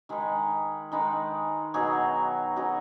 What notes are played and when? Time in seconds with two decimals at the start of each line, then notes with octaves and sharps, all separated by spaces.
0.09 D#3 G#3 D#4 B4
0.92 D#3 G#3 D#4 B4
1.74 B2 F#3 D#4 G#4
2.56 B2 F#3 D#4 G#4